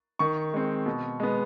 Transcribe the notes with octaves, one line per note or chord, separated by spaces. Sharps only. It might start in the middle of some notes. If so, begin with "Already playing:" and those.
D#3 C#6
G#3 C4
B2
G#3 B3